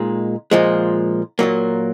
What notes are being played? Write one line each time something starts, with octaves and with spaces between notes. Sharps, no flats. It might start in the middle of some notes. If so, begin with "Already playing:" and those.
Already playing: A#2 G#3 D#4
A#2 F3 G#3
A#2 F#3 A#3